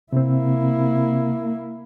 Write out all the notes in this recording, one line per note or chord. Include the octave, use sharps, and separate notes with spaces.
C3 A#3 C4 E4